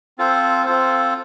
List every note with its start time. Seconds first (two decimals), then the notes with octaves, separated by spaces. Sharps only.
0.18 C4 F4 A4 C5
0.66 C4 F4 A4 C5